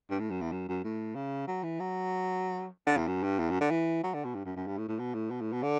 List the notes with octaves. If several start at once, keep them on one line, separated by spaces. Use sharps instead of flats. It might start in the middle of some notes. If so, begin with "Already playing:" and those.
G2
A2
F#2
E2
F#2
F#2
A2
C#3
F#3
E3
F#3
D3
E2
F#2
G2
E2
F#2
D3
E3
F#3
D3
B2
G2
F#2
F#2
G2
A2
A2
B2
A2
B2
A2
B2
D3